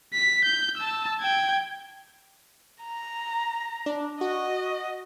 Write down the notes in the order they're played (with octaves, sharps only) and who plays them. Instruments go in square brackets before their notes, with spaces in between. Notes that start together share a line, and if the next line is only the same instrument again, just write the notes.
[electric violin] B6
G6
A5 E6
G5 G#6
[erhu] A#5
[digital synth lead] D4
[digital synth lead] F#4 [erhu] D#5